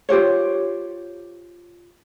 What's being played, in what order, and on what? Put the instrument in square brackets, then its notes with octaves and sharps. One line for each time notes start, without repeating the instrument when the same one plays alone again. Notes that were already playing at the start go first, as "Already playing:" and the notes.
[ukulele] F4 G4 C5 C#5